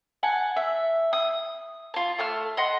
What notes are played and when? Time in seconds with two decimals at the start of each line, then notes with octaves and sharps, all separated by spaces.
0.23 F#5 G#5 A5
0.56 E5
1.13 D#6
1.94 F4 A5
2.19 A3 A5 F6
2.57 D#5 F#5 C6